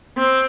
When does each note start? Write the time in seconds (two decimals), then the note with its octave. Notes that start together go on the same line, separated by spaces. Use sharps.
0.18 C4